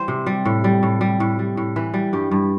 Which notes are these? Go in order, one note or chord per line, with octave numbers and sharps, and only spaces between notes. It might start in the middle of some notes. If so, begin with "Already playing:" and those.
Already playing: E3 G3 C5
C3
G3
A2
G3
A2
G3
A2
G3
A2
E3 B4
G3
G2 G4
G2